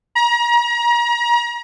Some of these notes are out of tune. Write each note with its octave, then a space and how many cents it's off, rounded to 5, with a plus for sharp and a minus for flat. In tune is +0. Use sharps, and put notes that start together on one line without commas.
A#5 +35